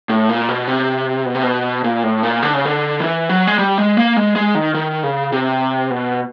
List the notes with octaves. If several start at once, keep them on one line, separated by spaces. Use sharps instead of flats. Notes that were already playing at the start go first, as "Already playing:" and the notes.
A2
A#2
B2
C3
B2
C3
B2
A#2
A2
A#2
D3
C#3
D3
E3
F#3
G#3
G3
G#3
A#3
G#3
G#3
D#3
D#3
C#3
C3
B2